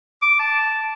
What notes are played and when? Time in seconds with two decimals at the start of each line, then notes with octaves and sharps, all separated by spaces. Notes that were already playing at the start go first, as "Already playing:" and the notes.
0.22 D6
0.39 A5